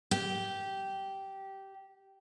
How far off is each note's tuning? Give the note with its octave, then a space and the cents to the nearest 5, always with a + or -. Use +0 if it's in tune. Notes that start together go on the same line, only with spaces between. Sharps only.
G4 -15